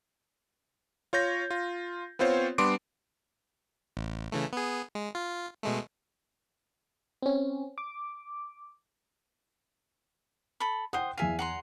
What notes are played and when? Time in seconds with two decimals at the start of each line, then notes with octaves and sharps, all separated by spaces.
1.13 F4 C#5 G6 A#6
1.50 F4
2.19 B3 C4 F4 C5 C#5
2.58 G3 B3 D4 C6 D6 D7
3.97 A1
4.32 C#3 E3 A3
4.53 B3 G#4
4.95 G#3
5.15 F4
5.63 B2 G#3 A3
7.23 C4 C#4
7.78 D6
10.60 A4 B5
10.93 C5 F#5 G5 D#6
11.18 E2 E5 F5 G#5 D#7
11.39 F#5 A#5 C6